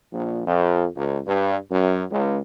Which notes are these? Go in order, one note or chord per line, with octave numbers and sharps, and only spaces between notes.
A#1
F2
C#2
G2
F#2
C#2